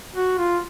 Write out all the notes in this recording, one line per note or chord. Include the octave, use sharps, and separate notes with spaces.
F#4
F4